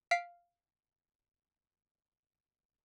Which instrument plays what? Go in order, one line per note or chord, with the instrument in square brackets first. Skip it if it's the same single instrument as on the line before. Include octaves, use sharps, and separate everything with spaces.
[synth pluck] F5 B6 C7 D7